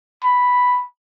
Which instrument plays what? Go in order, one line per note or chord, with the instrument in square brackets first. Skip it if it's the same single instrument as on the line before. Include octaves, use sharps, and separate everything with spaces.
[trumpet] B5